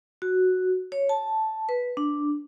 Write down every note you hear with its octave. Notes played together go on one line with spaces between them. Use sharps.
F#4
C#5
A5
B4
D4